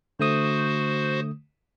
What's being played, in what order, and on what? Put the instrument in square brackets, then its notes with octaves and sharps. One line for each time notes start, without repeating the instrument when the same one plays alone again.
[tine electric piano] D3 A3 D#6 [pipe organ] F#4 C5